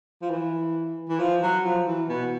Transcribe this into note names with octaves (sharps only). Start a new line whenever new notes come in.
F3
E3
E3
F3
F#3
F3
E3
B2